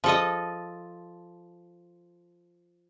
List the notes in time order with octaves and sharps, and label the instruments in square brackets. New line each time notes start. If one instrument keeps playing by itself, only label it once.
[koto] F3 A4 D#5